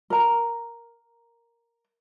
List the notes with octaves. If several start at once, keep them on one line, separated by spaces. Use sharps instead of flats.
A#4 A#5